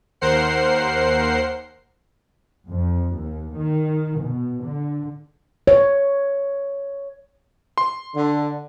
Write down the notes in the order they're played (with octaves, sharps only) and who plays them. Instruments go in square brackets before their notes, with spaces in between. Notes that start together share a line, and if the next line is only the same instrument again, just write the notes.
[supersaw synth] D#2 A#4 C5 F#5 C7
[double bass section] F2
D#2
D#3
B2
D3
[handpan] C#5
[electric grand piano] C6
[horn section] D3